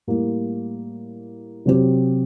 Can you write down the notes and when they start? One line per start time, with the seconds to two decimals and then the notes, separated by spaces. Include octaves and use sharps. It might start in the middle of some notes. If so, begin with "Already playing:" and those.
0.07 A2 G3 A#3
1.66 C3 F#3 C4 G4